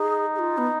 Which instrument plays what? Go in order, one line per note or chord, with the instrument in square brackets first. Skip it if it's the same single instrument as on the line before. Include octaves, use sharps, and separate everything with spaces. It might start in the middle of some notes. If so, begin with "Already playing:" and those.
Already playing: [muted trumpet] D#4 [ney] G#4
[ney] G#4
F4
B3